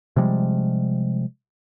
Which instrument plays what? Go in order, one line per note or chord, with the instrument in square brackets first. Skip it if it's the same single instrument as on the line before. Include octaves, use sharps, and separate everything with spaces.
[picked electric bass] C3 F3 G3 G#3